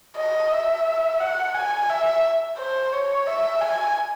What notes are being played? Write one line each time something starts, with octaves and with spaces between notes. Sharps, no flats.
D#5
E5
F#5
G#5
E5
C5
C#5
E5
G#5